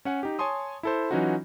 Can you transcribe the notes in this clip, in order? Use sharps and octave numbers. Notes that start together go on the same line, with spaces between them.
C#4 F#5 G#5
D#4 G4
C#5 G#5 A5 C6 D#6
E4 A4 C5
E3 F#3 C#4 D#4 F4 F#4